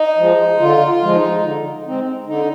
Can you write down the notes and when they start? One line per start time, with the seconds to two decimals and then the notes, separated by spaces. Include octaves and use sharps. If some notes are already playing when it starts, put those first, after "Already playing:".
Already playing: D#4
0.18 F3 G#3
0.60 D3 F4
0.87 F4
1.02 F3 G#3
1.15 D#4
1.43 D3
1.85 G#3 C4 D#4
2.27 D3 D#4